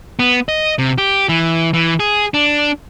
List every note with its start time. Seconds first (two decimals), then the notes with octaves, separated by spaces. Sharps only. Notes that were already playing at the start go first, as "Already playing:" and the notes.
0.19 B3
0.49 D#5
0.78 C3
0.98 G4
1.29 E3
1.74 E3
2.00 G#4
2.34 D4